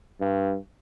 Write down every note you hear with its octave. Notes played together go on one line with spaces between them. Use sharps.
G2